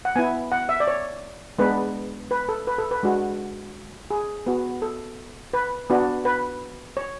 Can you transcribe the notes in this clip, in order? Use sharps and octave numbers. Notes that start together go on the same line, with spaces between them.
F#5
B3 E4 G#5
F#5
E5
D5
C#5
G#3 B3 D4 B4
B4
A4
B4
A4
B4
G#3 D4 F#4
G#4
B3 F#4
A4
B4
B3 D4 F#4
B4
C#5